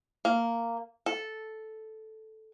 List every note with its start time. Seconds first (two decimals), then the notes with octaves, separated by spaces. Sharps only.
0.25 A#3
1.06 A4